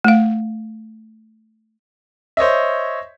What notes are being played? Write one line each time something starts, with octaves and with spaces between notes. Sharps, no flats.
A3 F5
C5 C#5 D#5 E5